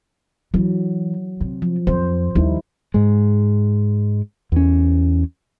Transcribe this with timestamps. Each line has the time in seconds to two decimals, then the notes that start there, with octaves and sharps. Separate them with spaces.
0.54 E3 F#3
1.41 C3
1.62 F3
1.87 F2 C5
2.35 D#2 G3 D#4 E4
2.94 G#2 G#3
4.52 E2 C#4